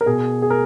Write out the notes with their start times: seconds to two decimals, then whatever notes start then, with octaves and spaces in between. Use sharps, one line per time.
0.01 A#4
0.06 B2 G#4
0.42 G#4
0.50 A#4